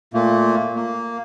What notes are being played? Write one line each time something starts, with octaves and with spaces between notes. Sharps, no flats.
A#2 A3 A#3
A#3